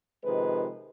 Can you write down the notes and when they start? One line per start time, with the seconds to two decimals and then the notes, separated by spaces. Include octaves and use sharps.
0.24 C3 D#3 F3 G#3 B4